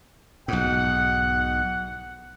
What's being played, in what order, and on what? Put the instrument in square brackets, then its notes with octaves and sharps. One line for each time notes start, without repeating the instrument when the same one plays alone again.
[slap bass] B1 G#2 [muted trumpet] F#5